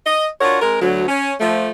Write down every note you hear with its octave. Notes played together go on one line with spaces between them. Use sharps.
D#5
D4 F4 F#4 A#4 C#5
G#3 C4 A#4
D2 F#3
C#4
F3 A3